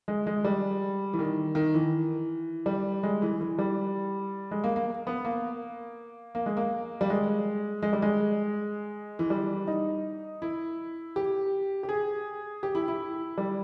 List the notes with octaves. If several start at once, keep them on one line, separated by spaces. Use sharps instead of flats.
G#3
G#3
G3
E3
D#3
D#3
E3
G3
G#3
E3
E3
G3
G#3
A#3
A#3
B3
A#3
A#3
G#3
A#3
G3
G#3
G#3
G3
G#3
E3
G3
D#4
E4
G4
G4
G#4
G4
E4
E4
G3